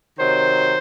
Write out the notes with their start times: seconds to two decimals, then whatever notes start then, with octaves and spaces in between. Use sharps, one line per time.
0.19 C3 D#3 F#3 C5